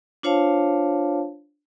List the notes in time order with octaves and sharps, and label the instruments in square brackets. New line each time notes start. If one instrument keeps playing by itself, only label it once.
[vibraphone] D4 F4 C5 C#5 F5 A5